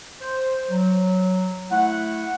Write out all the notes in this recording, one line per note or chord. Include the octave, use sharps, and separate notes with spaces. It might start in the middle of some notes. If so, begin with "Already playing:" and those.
C5
F#3
A3 E4 F#5